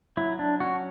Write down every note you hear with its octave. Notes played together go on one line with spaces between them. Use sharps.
F#3 E4
D4
C#4 F#4